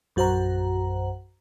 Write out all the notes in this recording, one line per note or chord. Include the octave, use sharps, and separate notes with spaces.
A#1 F#2 F#4 C5 F#5 A#5